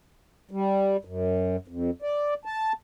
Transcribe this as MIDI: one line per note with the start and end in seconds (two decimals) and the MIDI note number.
0.51 0.97 55
1.05 1.57 42
1.68 1.90 41
2.02 2.34 74
2.45 2.72 81